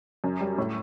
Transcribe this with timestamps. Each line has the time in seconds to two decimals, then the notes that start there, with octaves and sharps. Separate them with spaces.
0.24 F#2
0.41 G3
0.58 A2